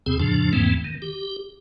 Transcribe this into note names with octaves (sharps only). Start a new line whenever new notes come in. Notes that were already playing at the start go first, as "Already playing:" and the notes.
E2 C3 C4 G#4
F2 A2 C#3 F3 D4
E2 G#2 E3 A3 A#3 C4
D#3
G4